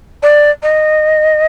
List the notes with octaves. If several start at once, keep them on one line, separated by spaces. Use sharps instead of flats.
D5
D#5